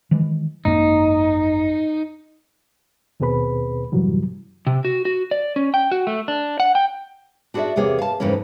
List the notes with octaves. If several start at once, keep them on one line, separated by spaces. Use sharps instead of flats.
D#3 E3 G#3
G#1 F#2 A#3 D#4
D#2 B2 C4 G#4 B4 B5
F#2 A2 C3 E3 F#3 G3
C3
F#4
F#4
D5
C#4
G5
F#4
A3
D4
F#5
G5
D4 F#4 G#4 B4 D5 E5
E2 C3 A#3 G#4 C#5
F5 A5
F2 G#2 C#3 E3 A#3 C#4